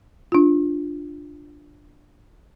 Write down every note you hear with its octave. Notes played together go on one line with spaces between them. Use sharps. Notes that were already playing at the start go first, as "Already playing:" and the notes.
D4 F4